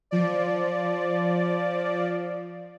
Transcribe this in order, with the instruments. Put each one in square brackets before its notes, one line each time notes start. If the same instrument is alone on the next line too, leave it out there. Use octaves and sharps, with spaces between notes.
[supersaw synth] F3 D5